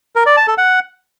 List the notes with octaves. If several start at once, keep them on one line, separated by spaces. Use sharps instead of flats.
A#4
D5
A5
A4
F#5